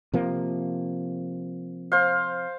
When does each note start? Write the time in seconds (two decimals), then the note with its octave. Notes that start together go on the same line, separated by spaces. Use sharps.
0.14 C3 F3 A#3
1.92 C5 F5